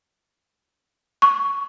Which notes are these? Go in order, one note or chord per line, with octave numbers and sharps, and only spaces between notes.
C#6